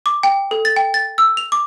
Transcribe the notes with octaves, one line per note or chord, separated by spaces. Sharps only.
D6
G5
A4
A6
G5
A6
E6
F7
D6